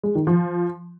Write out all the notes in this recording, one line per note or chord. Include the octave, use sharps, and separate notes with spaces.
G#3
D#3
F3